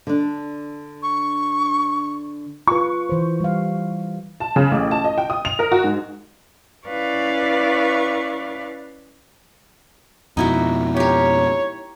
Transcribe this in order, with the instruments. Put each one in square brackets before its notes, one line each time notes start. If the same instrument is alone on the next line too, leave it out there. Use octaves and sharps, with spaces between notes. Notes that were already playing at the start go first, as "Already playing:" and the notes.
[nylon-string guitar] D3 D4
[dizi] C#6
[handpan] F4 B4 [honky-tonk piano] C#6
[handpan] E3 C5
G3 F5
[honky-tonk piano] A5
C#3
A1
A5
D#5
G5
D#6
F7
A#4
F#4
G#2
[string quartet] C#4 E4 B4 D5 F5 C#6
[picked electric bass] F2 B2 [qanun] D#4 E4 F#4
[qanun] G4 A#4 [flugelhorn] C#5